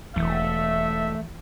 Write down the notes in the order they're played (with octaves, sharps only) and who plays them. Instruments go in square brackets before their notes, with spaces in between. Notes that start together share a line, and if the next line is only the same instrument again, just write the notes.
[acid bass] E1 [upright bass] E3 [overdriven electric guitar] A3 [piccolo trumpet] E5